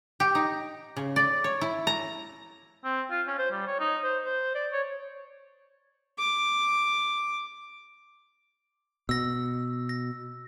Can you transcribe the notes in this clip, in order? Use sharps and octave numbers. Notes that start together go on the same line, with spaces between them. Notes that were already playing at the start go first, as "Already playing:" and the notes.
G4
D#4
C#3
D5
C#5
E4
A#5
C4
F4
C#4
C5
G3
C#5
D#4
C5
C5
D5
C#5
D6
B2 E6 A#6
A#6